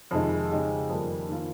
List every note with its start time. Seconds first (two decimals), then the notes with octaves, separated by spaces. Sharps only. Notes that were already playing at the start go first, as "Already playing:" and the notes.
0.11 F2 C3 D#3 G#3 D#4
0.51 C#3 G#3 D#4 G4
0.90 F2 D#3 G3 A#3
1.29 D#3 A#3 F4 A#4